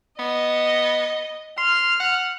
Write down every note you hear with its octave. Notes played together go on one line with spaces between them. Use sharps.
B3 D#5
C6 F6
F#5